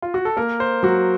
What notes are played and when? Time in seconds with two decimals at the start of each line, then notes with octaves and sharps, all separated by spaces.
0.02 F4
0.14 F#4
0.25 A4
0.37 A#3 A#4
0.60 C5
0.83 F#3 F#4